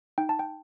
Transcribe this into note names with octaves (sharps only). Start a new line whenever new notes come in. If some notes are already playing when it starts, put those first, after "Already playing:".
D#4 G5
A5
G5